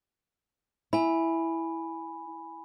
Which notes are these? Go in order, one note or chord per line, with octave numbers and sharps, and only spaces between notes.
E4 G#5 B5